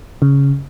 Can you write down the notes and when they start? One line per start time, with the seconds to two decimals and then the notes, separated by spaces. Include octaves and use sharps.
0.22 C#3